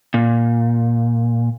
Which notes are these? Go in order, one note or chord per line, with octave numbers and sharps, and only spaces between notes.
A#2